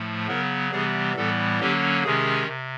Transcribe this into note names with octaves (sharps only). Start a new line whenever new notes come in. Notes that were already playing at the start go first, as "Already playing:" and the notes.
Already playing: A2 F3 A3
C#3 F#3 B3 A#4
C3 E3 G3 B3 G#4
A2 E3 G3 B3 A4
D3 F#3 A#3 C#4 G4
C3 D#3 G#3 C#4 G#4
C3